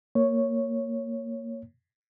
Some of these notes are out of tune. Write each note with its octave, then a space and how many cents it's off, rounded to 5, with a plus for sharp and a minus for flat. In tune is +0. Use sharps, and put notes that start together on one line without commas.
A#3 -10 C#5 +0